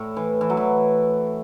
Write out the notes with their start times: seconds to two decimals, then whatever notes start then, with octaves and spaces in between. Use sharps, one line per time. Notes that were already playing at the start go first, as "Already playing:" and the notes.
Already playing: A2
0.17 E3
0.41 E3
0.50 F#3
0.57 E3